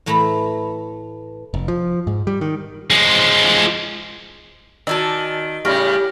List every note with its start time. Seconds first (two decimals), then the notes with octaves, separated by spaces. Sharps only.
0.06 A2 E3 A3 E4 A#5 B5
1.54 F1
1.68 F3
2.07 G#2
2.27 G3
2.41 D#3
2.91 F3 G#3
4.87 D#3 F#4 D5 G#5 A5 E6
5.65 A2 C#3 G3 G4 C#6 F6 A#6